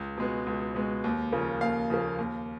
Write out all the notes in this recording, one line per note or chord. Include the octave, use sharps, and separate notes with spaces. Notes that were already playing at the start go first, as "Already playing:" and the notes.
Already playing: C#2
B2 G#3 B3
C#2
B2 G#3 B3
D#2
C#3 F3 A#3
D#2 F5
C#3 F3 A#3
D#2